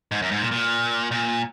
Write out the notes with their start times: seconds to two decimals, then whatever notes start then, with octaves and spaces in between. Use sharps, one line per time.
0.12 G#2
0.22 F#2
0.31 G#2
0.41 A#2
0.51 A#2
1.11 A#2